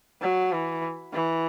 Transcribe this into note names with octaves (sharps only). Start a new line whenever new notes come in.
F#3
E3
E3